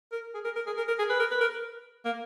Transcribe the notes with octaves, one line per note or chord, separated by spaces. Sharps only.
A#4
G#4
A#4
A#4
G#4
A#4
A#4
G#4
B4
A#4
B4
A#4
A#3